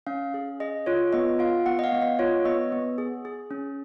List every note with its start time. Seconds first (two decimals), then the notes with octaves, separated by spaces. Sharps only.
0.07 C#4 F5
0.34 G#4
0.60 G#4 D#5
0.86 F4 C#5
1.13 B3 D#5
1.39 F4 F5
1.66 B3 F#5
1.79 D#5
1.84 F5
1.92 B3
2.02 D#5
2.19 F4 C#5
2.45 B3 D#5
2.72 B3
2.98 G#4
3.25 G#4
3.51 C#4